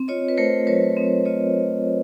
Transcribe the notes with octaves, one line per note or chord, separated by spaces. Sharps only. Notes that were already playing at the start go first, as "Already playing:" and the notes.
Already playing: C4
F4 C#5 D#5
B4
A3 A#4 C5
F#3 B4 C#5
C4
F4 C#5 D#5